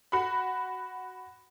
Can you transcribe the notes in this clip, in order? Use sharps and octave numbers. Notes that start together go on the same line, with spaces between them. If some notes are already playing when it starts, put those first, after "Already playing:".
F#4 B5